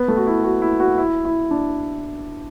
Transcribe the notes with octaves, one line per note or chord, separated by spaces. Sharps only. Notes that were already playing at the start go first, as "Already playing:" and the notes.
Already playing: B3
A3
F#4
E4
F#4
E4
F#4
E4
E4
D4